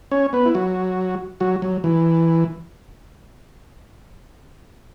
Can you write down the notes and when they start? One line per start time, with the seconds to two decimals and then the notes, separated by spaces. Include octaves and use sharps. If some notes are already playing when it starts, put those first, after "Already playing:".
0.11 C#4 C#5
0.33 B3 B4
0.45 E4
0.55 F#3 F#4
1.40 F#3 F#4
1.62 F#3
1.84 E3